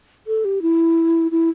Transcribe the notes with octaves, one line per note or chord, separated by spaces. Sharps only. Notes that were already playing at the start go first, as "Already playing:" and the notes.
A4
G4
E4
E4